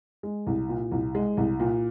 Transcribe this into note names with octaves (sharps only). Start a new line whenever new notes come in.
G#3
C2
A#2
C2
G#3
C2
A#2